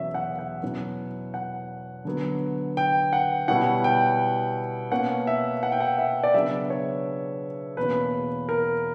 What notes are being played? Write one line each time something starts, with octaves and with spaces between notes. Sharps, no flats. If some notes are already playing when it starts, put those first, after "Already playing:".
Already playing: E2 B2 F#3 C#4 E5
F#5
F#5
B2 F#3 C#4 E4
F#5
D3 F#3 B3
G5
F#5
B2 G3 C#4 E4 F#5
G5
B2 A#3 C#4 F#5
E5
F#5
G5
F#5
E5
D5
C#3 F#3 B3 D4 E5
C#5
E2 B2 A#3 C#4 B4
A#4